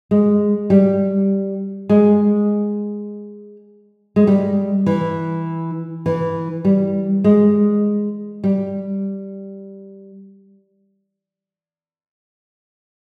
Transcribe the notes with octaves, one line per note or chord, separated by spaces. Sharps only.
G#3
G3
G#3
G#3
G3
E3
E3
G3
G#3
G3